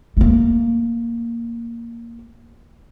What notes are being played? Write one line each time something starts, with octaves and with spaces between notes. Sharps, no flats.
A3 A#3